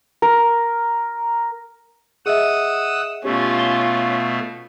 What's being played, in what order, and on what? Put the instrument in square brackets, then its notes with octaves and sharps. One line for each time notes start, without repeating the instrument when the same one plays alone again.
[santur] A#4
[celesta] G#4 D#5 E5 [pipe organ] F#5 D#6 E6
[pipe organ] B2 A3 [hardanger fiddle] C#4 F4 [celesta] G4
[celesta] G7